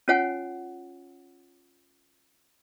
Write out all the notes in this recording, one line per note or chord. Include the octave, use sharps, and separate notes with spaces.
C#4 F4 C#5 F#5 G#5